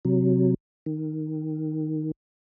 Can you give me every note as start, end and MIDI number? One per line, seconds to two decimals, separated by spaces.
0.05 0.54 48
0.05 0.54 54
0.86 2.11 51